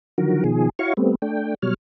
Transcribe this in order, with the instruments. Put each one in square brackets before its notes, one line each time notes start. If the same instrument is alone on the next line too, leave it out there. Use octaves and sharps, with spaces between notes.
[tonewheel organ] D3 D#3 F3 F#3 F#4 A#4
B2 D#3 F3 G#4
E4 F#4 C#5 F5 C#6
G3 A3 B3 C4
A3 D4 G5
B2 F#3 G3 C#5 F6